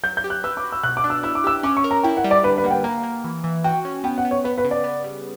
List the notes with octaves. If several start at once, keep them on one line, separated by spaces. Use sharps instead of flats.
F#3 G6
G6
G4
F#6
B4 E6
D6
F#4
E6
B2 F#6
D6
D4
E6
E4 E6
D6
G4 E6
C#4 D6
C#6
A#4
A#5
E4 G5
F#5
G3
D5
D3 B4
B4
A#3 F#5
G5
A#3 A#5
A#3
E3
E3
F#4 G5
C#4
B3 G5
F#5
B3
C#5
B3 B4
B4
C#3
D5
B3
G3